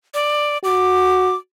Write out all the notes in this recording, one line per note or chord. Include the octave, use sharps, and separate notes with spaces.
D5
F#4 D6